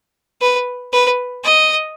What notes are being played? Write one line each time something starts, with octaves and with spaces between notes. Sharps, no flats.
B4
B4
D#5